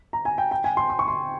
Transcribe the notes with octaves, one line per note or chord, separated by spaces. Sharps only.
A#5
G#5
G5
G5
G#5
C6
C6
C#6
C6